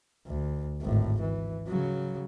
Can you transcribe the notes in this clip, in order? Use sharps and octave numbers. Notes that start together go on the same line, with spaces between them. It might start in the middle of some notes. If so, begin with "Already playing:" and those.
D2
G#1 A2
E3
C#3 F#3